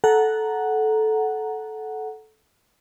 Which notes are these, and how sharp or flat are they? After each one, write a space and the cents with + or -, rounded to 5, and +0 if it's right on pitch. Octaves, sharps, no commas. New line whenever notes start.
A4 -15 F#5 +0 A#5 +0